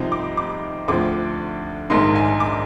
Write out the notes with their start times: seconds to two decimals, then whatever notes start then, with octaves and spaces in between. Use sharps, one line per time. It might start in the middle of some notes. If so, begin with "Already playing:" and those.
Already playing: C2 C3 F3 C4 D#4
0.12 D6
0.37 D6
0.88 D2 D3 F3 C4 D6
1.90 A#1 G#2 D#3 A#3 D#4 C6
2.15 G#5
2.40 D6